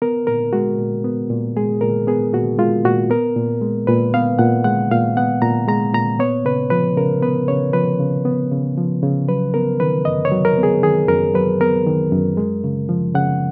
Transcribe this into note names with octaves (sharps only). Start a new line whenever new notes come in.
B3 A#4
A#2 A#4
G#3 F#4
A#2
B3
A#2
G#3 G#4
A#2 A#4
B3 G#4
A#2 F#4
G#3 F4
A#2 F#4
B3 A#4
A#2
G#3
A#2 B4
B3 F5
A#2 F#5
G#3 F#5
A#2 F5
B3 F#5
A#2 A#5
G#3 A#5
A#2 A#5
B3 C#5
C#3 B4
F3 B4
C#3 A#4
B3 B4
C#3 C#5
F3 B4
C#3
B3
C#3
F3
C#3
F#3 B4
B3 A#4
D#3 B4
F#2 D#5
C#5
F#3
A#4
B3
G#4
D#3 G#4
F#2 A#4
F#3 B4
B3 A#4
D#3
F#2
G#3
C#3
F3
C#3 F#5